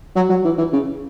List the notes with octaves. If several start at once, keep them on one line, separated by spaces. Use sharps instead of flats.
F#3
F#3
E3
E3
C#3